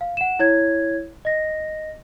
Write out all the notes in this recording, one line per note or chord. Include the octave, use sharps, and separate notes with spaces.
F5
F#5 E7
E4 C#5 G#6
D#5 A#6